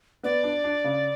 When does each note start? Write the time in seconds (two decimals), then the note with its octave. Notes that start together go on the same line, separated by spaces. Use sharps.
0.23 B3 D5
0.43 D4
0.64 D4
0.84 C#3